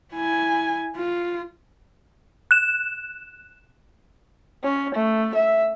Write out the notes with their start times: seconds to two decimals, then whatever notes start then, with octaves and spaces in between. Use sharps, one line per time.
0.13 E4 G#5
0.97 F4
2.51 F#6 E7
4.63 C#4
4.94 A3
5.35 E5